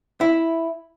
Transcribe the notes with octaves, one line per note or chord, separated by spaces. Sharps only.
E4